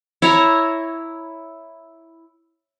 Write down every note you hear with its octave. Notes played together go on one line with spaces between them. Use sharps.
E4 C#5 A#5